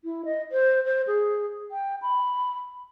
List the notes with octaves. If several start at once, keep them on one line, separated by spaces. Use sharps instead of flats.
E4
D#5
C5
C5
G#4
G5
B5